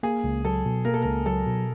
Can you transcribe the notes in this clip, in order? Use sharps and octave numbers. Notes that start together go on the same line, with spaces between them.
A#3 G#4
C#2
F#3 A4
B2
A#3 A#4
A4
C#2 A#4
F#3 A4
B2